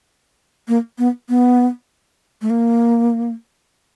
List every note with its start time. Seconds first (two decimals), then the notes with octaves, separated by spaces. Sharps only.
0.68 A#3
0.99 B3
1.29 B3
2.42 A3
2.50 A#3